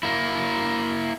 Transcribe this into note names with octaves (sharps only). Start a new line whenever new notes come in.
A#3 E4